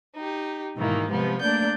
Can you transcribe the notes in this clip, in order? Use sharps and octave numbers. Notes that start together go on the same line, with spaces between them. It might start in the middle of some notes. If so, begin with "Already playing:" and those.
D#4 G4
G#2 B2 D#3 E3 A#3
C3 F3 G3 G#3 B3
A3 A#3 D4 D5 G6